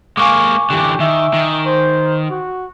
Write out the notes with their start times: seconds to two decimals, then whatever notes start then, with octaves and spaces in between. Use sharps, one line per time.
0.17 G#3 A#3 F5 G#5 C#6 D6
0.70 D3 E3 G4
1.00 D#3 E5
1.34 D#3
1.66 C5
2.30 F#4